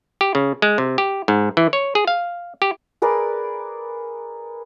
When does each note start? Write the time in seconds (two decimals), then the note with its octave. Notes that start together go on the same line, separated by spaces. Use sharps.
0.21 G4
0.35 C#3
0.62 G#3
0.78 C3
0.98 G4
1.28 G#2
1.57 E3
1.73 C#5
1.95 G#4
2.07 F5
2.62 G4
3.02 G#4 A#4 B4 D5